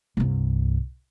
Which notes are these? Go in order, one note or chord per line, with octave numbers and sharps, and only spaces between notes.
C2 G2